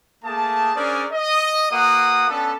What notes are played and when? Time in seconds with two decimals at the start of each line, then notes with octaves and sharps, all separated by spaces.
0.24 A3 A#3 G#4 A5
0.75 C#4 D4 G#4 A#4 C5 D5
1.12 D#5
1.71 A#3 F#4 B4 F#5 D#6
2.29 B3 C#4 D4 A4